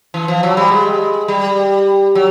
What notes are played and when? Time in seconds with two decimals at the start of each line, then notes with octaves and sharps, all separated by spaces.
0.14 E3
0.28 F3
0.43 F#3
0.57 G3
0.71 G#3
1.28 G3
2.15 F#3